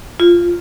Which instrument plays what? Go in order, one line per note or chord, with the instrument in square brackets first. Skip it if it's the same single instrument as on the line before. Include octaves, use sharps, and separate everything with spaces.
[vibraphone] F4